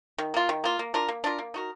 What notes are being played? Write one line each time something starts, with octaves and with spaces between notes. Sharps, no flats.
D#3
A#3 F4
D#3
A#3 F4
A#3
D4 F4 A#4
A#3
D4 F4 A#4
A#3
D#4 F#4 A#4